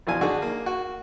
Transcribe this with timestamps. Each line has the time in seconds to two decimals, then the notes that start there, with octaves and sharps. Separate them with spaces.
0.07 F2 B2 E3 D4 F5 G#5
0.21 D3 D#4 F#4 G#4
0.42 A#3
0.66 F#4